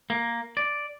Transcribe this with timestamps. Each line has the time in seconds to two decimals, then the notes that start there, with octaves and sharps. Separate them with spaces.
0.10 A#3
0.57 D5